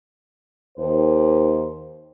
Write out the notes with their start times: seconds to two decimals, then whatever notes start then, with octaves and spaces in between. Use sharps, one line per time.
0.77 D#2 C5